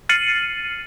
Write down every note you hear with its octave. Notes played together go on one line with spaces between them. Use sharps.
F6 A6 C7 C#7 D#7 F#7